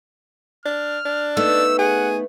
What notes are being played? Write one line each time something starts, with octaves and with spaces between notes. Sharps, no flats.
D4 F6
D4
A3 B3 D#4 E6
G#4 F#5